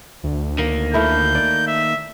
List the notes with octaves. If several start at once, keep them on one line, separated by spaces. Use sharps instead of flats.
D2
D#3 A#3
A3 E4 A#4 G6
D5
E5